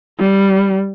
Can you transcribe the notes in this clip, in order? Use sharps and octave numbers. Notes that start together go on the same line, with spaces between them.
G3